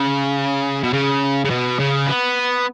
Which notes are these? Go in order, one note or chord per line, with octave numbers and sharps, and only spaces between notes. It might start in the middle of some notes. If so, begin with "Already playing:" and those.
Already playing: C#3
B2
C#3
C#3
B2
C#3
B3